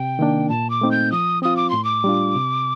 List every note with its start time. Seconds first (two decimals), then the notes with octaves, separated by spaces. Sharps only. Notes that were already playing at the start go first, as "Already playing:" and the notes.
Already playing: C3 G5
0.19 D#3 A#3 D4
0.49 A#2 A5
0.70 D6
0.81 A3 C4 D#4
0.91 G6
1.12 F3 D#6
1.42 C4 F4 D#6
1.57 D6
1.70 A2 C6
1.84 D6
2.04 G3 D4 F4
2.35 C3